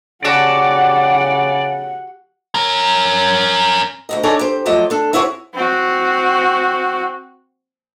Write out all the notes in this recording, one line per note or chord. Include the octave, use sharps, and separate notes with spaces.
C#3 F#4 G4 D5 F#5 A5
C#4 A#4
D2 A#2 D#5
D4 D#4 G#4 A4 C#5 D5
G4 C5
F3 F#3 A3 D5 D#5
D4 A4
C4 E4 F#4 G#4 A4 C#5
C4 F#4